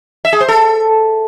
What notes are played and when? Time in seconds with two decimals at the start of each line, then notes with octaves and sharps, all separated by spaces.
0.25 E5
0.33 G#4
0.41 C5
0.48 A4